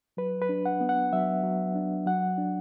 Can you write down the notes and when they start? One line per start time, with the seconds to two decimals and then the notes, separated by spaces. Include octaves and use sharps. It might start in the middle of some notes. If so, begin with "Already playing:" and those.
0.17 F#3 B4
0.42 B4
0.49 D4
0.66 F#5
0.81 B3
0.89 F#5
1.13 F#3 E5
1.43 F#3
1.75 D4
2.06 F#3 F#5
2.38 D4